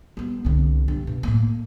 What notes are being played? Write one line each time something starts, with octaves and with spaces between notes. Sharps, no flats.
G3 B3
C2 D3
G2
B2
A2 A#3